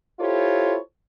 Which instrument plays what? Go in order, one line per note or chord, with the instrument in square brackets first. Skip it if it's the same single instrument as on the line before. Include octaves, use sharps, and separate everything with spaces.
[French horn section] E4 F4 G4 A4 C5 C#5